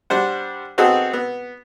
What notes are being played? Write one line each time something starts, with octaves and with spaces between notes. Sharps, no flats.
G3 D4 C5 F#5
B3 C4 D#4 F#4 G#4 A4
B3